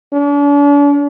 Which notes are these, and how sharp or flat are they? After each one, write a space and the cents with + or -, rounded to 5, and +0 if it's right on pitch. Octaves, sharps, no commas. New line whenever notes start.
D4 -45